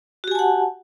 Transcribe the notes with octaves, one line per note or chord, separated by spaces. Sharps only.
F#4 G4 F#5 G#5 A5